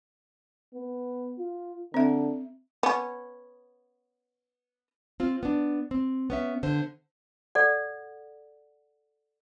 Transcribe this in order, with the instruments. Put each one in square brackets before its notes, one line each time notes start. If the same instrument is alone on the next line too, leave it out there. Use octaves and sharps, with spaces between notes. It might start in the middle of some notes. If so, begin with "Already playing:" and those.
[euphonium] B3
F4
[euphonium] D3 [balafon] C4 E5
[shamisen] B3 C#4
[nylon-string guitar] C4 F4
B3 D4
C4
B3 C#4 E5
D3 C5
[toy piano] A4 D5 F#5